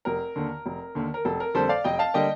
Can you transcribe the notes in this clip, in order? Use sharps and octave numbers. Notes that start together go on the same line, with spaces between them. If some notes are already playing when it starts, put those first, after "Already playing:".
F1 A#4
D#2 D3
F1
D#2 D3
A#4
F1 A4
A#4
F2 D3 G3 A#3 A4 C5
D5 F5
F1 D#5 G5
F5 A5
D3 G3 A#3 D#5 G5